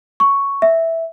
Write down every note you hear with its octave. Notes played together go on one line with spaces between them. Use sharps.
C#6
E5